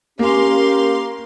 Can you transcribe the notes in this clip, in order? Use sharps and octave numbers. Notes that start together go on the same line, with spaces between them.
A#3 C#4 G4 F5 C6